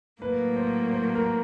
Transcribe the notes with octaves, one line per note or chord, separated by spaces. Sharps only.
A2 F#3 A#3 B4
C5
C5
A#4